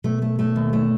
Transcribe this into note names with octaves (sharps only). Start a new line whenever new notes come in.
B2 A3
A3
A3
D#2
A3